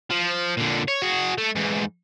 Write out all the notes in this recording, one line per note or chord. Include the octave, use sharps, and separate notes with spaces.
F3
A#2 D3
C#5
F#4 G#4
A3
G#2 E3